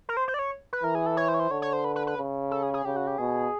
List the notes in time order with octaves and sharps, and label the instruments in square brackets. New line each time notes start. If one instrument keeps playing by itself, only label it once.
[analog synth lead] A#4
C5
C5
D5
C#5
B4
[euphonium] E3 [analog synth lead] A#4
[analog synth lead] G#4
A4
C#5
C5
C#5
C5
[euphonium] D3 [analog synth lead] C#5
[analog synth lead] C#5
C5
B4
B4
B4
[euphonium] C#3
[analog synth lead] A4
G#4
G#4
[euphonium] C#3 [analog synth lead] G4
[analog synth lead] F#4
G4
[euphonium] B2 [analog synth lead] G#4